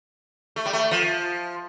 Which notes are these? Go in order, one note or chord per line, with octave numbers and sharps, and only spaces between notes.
A3
G3
A3
F3